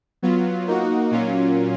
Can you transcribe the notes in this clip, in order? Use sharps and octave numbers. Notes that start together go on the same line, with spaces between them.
F#3 B3 F4
A#3 D#4 F#4
A#2 F#3 A#3 C#4 F4